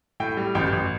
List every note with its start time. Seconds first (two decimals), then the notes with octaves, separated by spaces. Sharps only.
0.20 A2 G5
0.37 G3
0.55 A1 G5
0.72 A1